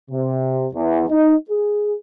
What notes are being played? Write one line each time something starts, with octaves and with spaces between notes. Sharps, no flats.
C3
E2
D#4
G#4